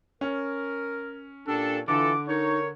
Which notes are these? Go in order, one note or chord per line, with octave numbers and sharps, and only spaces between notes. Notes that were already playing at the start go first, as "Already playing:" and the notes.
C#4 A#4
A#2 D4 G4 A4
D3 E3 F4 A4 D6
D#4 A#4 C#5